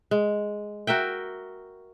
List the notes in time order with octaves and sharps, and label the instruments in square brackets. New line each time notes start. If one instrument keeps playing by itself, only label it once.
[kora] G#3
F#4 A#4 E5 G5